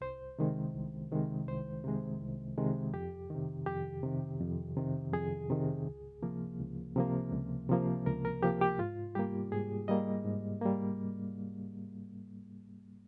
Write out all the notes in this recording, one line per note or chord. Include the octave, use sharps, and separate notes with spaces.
C2 C5
C3 D#3 G#3
C2
C3 D#3 G#3
C2 C5
C3 D#3 G#3
C2
C3 D#3 G#3
F2 G4
C3 D#3
F2 G4
C3 D#3
F2
C3 D#3
F2 G#4
C3 D#3
C#2
C3 F3 A#3
C#2
C3 F3 A#3
C#2
C3 F3 A#3
C#2 A#4
A#4
C3 F3 A#3 G4
G4
G#2 F4
G3 A#3 G4
G#2 G#4
G3 A#3 D#5
G#2
G3 A#3